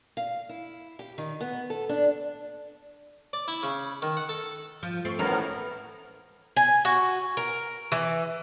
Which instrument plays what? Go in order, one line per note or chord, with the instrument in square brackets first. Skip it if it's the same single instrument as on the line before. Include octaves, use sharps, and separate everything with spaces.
[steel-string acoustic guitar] F5
E4
G4
D#3
B3
A4
D4
[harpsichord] D5
E4
C#3
D#3
F#5
A4
[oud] F3
[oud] A3 C4 [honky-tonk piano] C#6 C7
[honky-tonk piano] A1 C#4 F7 [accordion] A2 B3 A#4
[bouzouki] G#5
F#4
A#4
E3